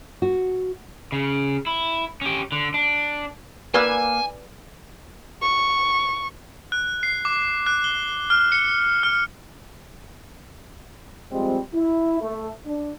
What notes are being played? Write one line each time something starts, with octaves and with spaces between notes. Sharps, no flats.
F#4
C#3
E4
C#4 G4
D3
D4
A#3 B4 D5 G#5 E6
C#6
F#6
C7
D6
F#6
G7
F6
C#7
F6
F3 G3 G#3 C4
E4
A3
D4